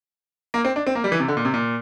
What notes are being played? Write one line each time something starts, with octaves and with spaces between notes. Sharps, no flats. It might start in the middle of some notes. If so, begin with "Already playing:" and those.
A#3
C4
D4
C4
A#3
G3
E3
C3
D3
A#2
C3
A#2